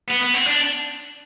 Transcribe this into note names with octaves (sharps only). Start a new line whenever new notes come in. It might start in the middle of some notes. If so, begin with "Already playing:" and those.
B3
B3
C4
D4